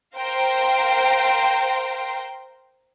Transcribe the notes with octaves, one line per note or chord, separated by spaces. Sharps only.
A#4 C5 F5 G5 A#5